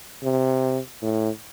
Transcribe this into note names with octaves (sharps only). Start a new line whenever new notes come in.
C3
A2